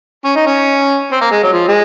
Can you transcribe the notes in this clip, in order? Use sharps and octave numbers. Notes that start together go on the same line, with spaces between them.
C#4
D#4
C#4
C4
A#3
G#3
F#3
F3
G#3